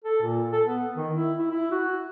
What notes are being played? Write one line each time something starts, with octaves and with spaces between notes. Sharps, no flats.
A4
A#2
A4
B3
D#3
E4
E4
E4
F#4